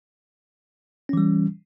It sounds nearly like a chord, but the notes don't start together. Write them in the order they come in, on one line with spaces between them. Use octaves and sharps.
C#4 E3 G3